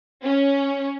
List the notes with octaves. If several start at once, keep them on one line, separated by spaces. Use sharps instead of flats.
C#4